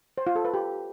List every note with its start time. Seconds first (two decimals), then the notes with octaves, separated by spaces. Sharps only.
0.18 C5
0.27 F4
0.36 A4
0.45 B4
0.54 G4